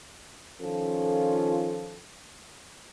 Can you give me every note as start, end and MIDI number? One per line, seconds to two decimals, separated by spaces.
0.61 2.03 51
0.61 2.03 53
0.61 2.03 61
0.61 2.03 65
0.61 2.03 69